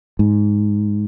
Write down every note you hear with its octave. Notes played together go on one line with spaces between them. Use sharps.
G#2